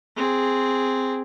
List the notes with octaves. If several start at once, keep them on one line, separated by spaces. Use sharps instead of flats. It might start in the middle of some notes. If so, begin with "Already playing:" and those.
C4 G#4